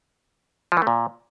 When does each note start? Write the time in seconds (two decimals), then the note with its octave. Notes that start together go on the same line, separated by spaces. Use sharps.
0.72 F3
0.77 E3
0.82 A3
0.87 A#2